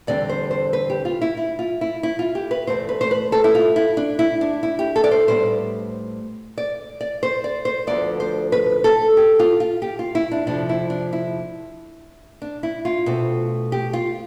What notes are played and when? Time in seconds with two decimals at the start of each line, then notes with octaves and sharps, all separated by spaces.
0.07 E2 D3 G3 C4 D5
0.29 C5
0.51 C5
0.73 B4
0.90 G4
1.05 F4
1.21 E4
1.37 E4
1.59 F4
1.81 E4
2.03 E4
2.19 F4
2.35 G4
2.51 B4
2.67 E2 B2 A3 C4 C5
2.89 B4
3.01 C5
3.11 B4
3.32 A4
3.44 E4
3.55 F4
3.76 E4
3.97 D4
4.19 E4
4.41 D4
4.63 E4
4.79 G4
4.96 A4
5.04 D5
5.11 C5
5.28 A2 G3 B3 C5
6.58 D5
7.01 D5
7.23 C5
7.44 D5
7.65 C5
7.87 D2 D3 F3 B3 D5
8.20 C5
8.52 B4
8.84 A4
9.17 G4
9.39 F4
9.60 F4
9.82 G4
9.99 F4
10.15 E4
10.32 D4
10.47 F2 C3 F3 D4
10.69 E4
10.90 D4
11.13 E4
12.42 D4
12.63 E4
12.85 F4
13.06 B2 A3 C4
13.72 G4
13.93 F4